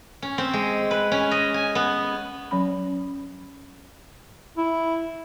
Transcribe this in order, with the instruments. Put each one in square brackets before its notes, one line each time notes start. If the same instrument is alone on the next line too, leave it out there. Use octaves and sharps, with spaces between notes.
[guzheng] C#4
C4
G#3
B4
C#4
D#5
G#5
B3
[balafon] F#3 C#4 B5
[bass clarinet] E4